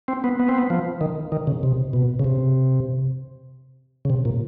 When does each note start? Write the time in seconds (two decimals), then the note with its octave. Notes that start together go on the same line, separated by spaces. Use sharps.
0.08 C4
0.24 B3
0.40 B3
0.49 C4
0.58 B3
0.70 F3
1.01 D#3
1.32 D#3
1.47 C#3
1.63 C3
1.93 B2
2.19 C#3
2.24 C3
4.05 C#3
4.10 C3
4.25 A#2